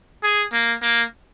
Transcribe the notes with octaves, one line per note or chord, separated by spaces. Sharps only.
G#4
A#3
A#3